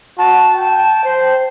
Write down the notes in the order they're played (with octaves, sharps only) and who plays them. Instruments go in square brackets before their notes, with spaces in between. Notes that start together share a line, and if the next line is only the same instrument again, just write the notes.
[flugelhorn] F#4 [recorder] A5
[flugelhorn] G5
[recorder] C5